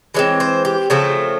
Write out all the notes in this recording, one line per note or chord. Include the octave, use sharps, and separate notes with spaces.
E3 G#3 C4 C#5
C5
G4
C#3 F3 A3 C4 A4